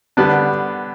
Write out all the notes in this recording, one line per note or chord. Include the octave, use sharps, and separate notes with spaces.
D3 G3 B3 D4